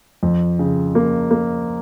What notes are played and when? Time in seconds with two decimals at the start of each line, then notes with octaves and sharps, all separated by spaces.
0.23 F2
0.59 C#3
0.95 A#3
1.31 A#3